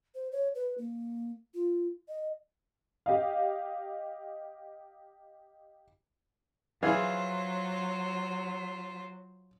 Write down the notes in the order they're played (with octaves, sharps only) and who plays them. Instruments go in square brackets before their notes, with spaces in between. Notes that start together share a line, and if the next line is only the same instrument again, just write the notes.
[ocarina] C5
C#5
B4
A#3
F4
D#5
[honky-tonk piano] G4 D#5 F5
[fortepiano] E3 G#4 [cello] F#3 [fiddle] F4 C5 [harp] F5 G#6